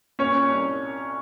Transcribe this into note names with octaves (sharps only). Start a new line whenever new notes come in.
A#2 C#4 C#5
C2